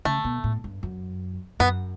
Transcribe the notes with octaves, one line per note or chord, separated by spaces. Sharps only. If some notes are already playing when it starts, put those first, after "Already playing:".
C#3 A3
B2
A2
G2
F#2
F#2 B3